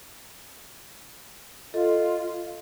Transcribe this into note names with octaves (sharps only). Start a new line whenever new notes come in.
F4 A4 D#5